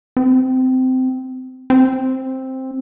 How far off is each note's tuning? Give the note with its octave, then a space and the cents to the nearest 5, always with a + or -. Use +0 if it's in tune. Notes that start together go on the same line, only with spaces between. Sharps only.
C4 -20
C4 +5